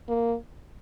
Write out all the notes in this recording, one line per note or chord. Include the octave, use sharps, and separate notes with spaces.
A#3